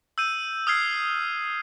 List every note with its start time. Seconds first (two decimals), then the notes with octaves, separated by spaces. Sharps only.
0.18 E6 G6 D#7
0.67 D#6 F6 G#6 C7